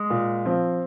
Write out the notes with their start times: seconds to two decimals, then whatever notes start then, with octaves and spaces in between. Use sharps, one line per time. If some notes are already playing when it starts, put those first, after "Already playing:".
Already playing: G#3
0.10 A#2
0.46 F3 C4